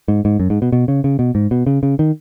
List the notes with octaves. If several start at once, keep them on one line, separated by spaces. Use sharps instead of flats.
G#2
G#2
F#2
G#2
B2
B2
C#3
C#3
B2
G#2
B2
C#3
C#3
D#3